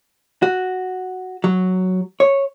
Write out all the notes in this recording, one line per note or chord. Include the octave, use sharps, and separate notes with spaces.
F#4
F#3
C#5